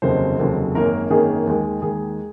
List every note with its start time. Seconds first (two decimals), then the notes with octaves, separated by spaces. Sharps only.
0.02 F1 D#2 C#3 F#3 C5
0.39 F1 D#2 C#3 F#3
0.75 G#1 F#2 D#3 A#3 C#4 A#4
1.10 G#1 F#2 D#3 A#3 C#4 G#4
1.47 D#2 D#3 G#3
1.82 D#2 D#3 G#3 G#4